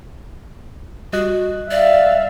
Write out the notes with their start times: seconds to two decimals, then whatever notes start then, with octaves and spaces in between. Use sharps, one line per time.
1.13 G3 F#4 D#5 F#6
1.71 D5 E5 F5